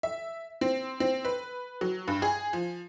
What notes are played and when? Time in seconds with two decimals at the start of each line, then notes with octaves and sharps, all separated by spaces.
0.03 E5
0.61 C4
1.00 C4
1.25 B4
1.81 F#3
2.08 G2
2.22 G#4
2.53 F3